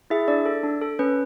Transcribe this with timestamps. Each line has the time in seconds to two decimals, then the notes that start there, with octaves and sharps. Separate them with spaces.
0.10 E4 G#4 E5
0.28 D4 D5
0.46 A4
0.64 D4
0.81 A4
0.99 C#4 B4